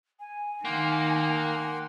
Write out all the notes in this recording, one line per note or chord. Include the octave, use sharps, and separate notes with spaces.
G#5
D#3 A#3 F#5 G5 C6